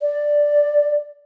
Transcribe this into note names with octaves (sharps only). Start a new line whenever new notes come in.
D5